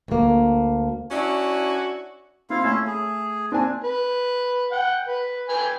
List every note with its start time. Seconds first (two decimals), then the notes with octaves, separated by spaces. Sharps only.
0.08 D2 A#3
1.11 C#4 D4 E4 F#4
2.50 C4 E4 F4 F5
2.64 A3 C#4 E4 E5
2.87 G#4
3.52 C4 D4 G#5
3.84 B4
4.72 F#5 G5
5.07 B4
5.49 B4 G5 G#5